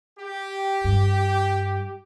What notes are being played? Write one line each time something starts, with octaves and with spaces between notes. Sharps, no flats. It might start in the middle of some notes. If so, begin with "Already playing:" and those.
G4
G2